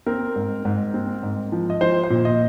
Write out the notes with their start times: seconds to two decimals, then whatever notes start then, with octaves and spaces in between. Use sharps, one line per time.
0.06 C4 A#4
0.36 G#2
0.65 G#2
0.94 C4
1.23 G#2
1.52 F3
1.70 D#5
1.81 F3 C5
2.04 C5
2.10 A#2
2.25 D#5